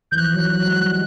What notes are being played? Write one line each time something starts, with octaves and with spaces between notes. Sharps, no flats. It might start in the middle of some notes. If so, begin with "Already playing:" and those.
E3 G6
F3 F#6
F#3
F#3
G#3
G3